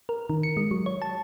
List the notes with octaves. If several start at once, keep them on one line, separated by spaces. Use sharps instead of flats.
A#4
D#3
C#7
G#3
F#3
C#5
A5